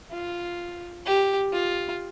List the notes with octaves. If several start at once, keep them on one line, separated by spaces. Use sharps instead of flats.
F4
G4
F4